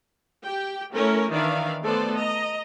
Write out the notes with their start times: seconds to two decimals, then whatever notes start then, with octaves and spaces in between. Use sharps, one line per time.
0.43 G4 G5
0.93 A3 C#4 E4 A#4
1.30 D#3 E3 D4 D5 E5 F5
1.82 A3 B3 A4 C5 D5
2.16 D#5 A#5